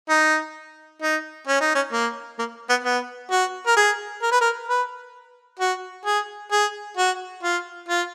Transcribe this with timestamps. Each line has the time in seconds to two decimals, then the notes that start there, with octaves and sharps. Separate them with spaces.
0.09 D#4
1.02 D#4
1.48 C#4
1.61 D#4
1.75 C#4
1.93 A#3
2.39 A#3
2.69 B3
2.84 B3
3.31 F#4
3.67 A#4
3.77 G#4
4.23 A#4
4.32 B4
4.41 A#4
4.68 B4
5.59 F#4
6.05 G#4
6.52 G#4
6.97 F#4
7.43 F4
7.89 F4